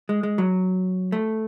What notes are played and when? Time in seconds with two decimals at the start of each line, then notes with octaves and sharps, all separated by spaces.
0.09 G#3
0.23 G#3
0.38 F#3
1.12 A3